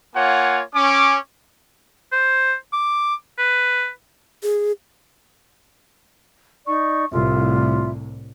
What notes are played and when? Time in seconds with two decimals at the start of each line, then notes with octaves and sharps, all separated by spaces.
0.15 A#3 F4 C#5 F#5 G#5
0.74 C#4 D6
2.12 C5
2.73 D6
3.38 B4
4.43 G#4
6.66 D#4 D5 C#6
7.12 C2 A2 F4 E5